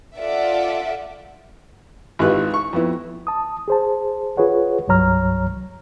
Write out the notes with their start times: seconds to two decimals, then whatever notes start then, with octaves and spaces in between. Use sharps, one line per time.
0.18 F4 A4 D5 E5 F#5
2.19 G#1 E4 F4 G4 B4 F#6
2.54 C#6
2.73 F2 B3 E4
3.27 A5 D#6
3.68 G#4 C5 A5
4.37 F4 G#4 B4 C#5 F#5
4.88 C2 G2 F#3 C#5 A#5 F6